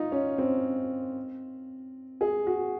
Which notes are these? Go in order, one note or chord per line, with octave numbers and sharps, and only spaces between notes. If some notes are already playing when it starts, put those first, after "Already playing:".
Already playing: D#4 F4
C#4
C4
G#4
F#4